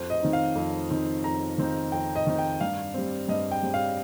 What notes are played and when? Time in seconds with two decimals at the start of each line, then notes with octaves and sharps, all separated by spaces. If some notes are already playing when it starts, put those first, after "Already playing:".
Already playing: F2 C5
0.10 D#5
0.22 D#3 C4 D#4
0.33 F5
0.55 F2
0.89 D#3 C4 D#4
1.24 F2 A#5
1.58 D#3 C4 D#4
1.92 F2 G5
2.16 D#5
2.27 D#3 C4 D#4
2.38 G5
2.61 G2 F5
2.94 G3 C4
3.28 G2 D#5
3.51 G5
3.63 G3 C4
3.74 F5